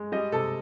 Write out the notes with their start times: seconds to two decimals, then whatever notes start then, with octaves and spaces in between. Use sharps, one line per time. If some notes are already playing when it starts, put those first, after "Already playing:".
Already playing: G#3
0.12 G3 D#5
0.32 C3 A4